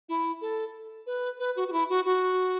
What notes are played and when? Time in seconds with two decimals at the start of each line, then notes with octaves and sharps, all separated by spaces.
0.09 E4
0.41 A4
1.06 B4
1.39 B4
1.56 F#4
1.68 F#4
1.72 E4
1.89 F#4
2.05 F#4